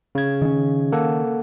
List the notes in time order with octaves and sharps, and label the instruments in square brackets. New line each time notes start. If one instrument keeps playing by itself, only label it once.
[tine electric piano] C#3 G#6
[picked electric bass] D#3 C#4
[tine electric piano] A#3 A4 F#5